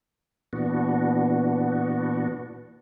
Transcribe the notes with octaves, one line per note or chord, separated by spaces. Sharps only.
A#2 E3 B3 D4 F#4